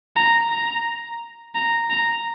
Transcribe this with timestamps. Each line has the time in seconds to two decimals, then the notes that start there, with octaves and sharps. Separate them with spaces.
0.16 A#5
0.50 A#5
1.55 A#5
1.90 A#5